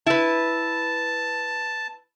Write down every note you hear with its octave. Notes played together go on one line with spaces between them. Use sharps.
E4 B4 A5